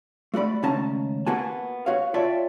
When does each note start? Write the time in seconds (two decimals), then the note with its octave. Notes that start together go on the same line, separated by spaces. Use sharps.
0.34 A3 F#4 D5 B5
0.63 C#2 D#3 A3 C#4 A5 A#5
1.27 A#3 B3 F#4 G#5 A5
1.86 F#4 C#5 F5
2.14 F4 C#5 D5 E5 G5 A5